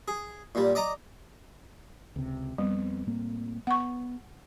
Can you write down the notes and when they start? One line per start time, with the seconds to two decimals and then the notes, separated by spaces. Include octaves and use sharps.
0.08 G#4
0.55 A#2 G3
0.75 D5 D#5 A#5 D6
2.16 C#2 C3
2.58 F2 G3 B3 C4
3.07 A2 A#3 C4
3.67 B3 F#5 C#6